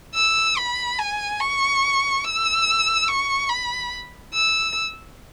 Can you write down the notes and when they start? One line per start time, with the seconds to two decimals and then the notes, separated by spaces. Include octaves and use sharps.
0.15 E6
0.57 B5
0.99 G#5
1.40 C#6
2.24 E6
3.08 C#6
3.49 B5
4.33 E6